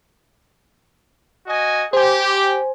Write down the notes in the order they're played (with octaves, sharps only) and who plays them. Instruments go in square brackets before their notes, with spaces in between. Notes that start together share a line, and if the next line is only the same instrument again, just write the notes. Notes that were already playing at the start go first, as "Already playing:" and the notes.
[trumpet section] F#4 D#5 G#5
[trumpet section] G4 [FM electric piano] C5 G#5